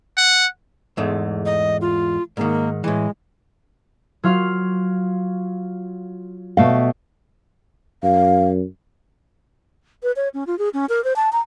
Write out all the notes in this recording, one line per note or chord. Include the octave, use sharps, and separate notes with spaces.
F#5
E2 G#2 A3
D#5
F4
G#2 D#3 A#3
A2 E3 G#3
F#3 F4 F5
B2 A3 F5
F#2 F5
B4
C#5
C#4
F4
G#4
C#4
A#4
C5
A5
A#5